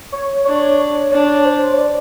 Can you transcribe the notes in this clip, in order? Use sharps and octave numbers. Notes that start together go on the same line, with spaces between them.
C#5
D4 C#5
C#5
D4 C#5
C5
C#5
D5